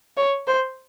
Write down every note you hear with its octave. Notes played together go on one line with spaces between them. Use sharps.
C#5
C5